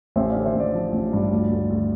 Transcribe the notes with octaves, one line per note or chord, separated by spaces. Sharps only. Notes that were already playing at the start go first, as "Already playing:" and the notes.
A1 C5 E5
D5 F5
D3
C5 E5
A1 D5
F3
A1
G2
D2
D2
D2